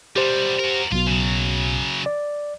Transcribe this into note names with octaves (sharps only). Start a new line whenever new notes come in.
B2 G3 G4 C5
F#4 A#4
B1 B2 F4
C#3 F#3
D5